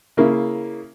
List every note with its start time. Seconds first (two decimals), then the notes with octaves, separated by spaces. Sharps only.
0.17 C#3 A#3 E4